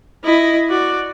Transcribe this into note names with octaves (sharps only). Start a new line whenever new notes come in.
E4 D#5
F#4 D5